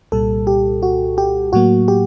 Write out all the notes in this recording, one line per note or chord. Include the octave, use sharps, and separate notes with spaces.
C2 A#2 G3 A4
G4
F#4
G4
A2 F#3 A#3 F#4
G4